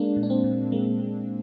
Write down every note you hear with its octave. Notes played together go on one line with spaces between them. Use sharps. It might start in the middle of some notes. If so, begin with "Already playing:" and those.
Already playing: G#3 A#3 D4
A#2
D4
C4
A#2
G#3 A#3
G#3